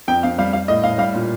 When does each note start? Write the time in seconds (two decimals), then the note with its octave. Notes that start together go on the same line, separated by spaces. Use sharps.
0.08 F2 G5
0.23 F2 F5
0.38 G3 F5
0.53 G3 F5
0.68 A2 D#5
0.84 A2 F5
0.98 G3 F5
1.14 A#2